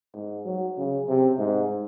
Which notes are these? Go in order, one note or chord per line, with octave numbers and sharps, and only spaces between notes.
G#2
F#3
C#3
C3
G#2